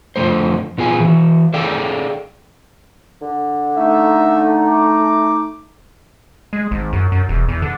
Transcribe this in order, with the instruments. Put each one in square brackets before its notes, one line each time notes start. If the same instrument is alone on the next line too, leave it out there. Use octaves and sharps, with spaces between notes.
[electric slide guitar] F2 D3 E3 F3 A3 C5
A#2 B3 F4 G#4 G#5
E3 F#4
G#4 A4 D5 F5 G5
[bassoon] D3
[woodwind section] A3 D#4 [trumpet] E5
[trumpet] D6
[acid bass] G#3
G#1
F#2
F#2
E1
E2
D3